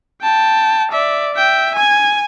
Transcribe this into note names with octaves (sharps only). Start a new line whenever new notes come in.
G5 A5
D5 E5
E5 G5
G#5 G#6